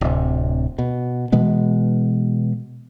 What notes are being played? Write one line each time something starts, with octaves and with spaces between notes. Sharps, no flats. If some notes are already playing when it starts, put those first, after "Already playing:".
D1 C3
B2
B2 E3 G#3 B3